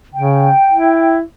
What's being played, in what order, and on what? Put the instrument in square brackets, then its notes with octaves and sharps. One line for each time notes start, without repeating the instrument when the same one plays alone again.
[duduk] C#3 [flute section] G5
[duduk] E4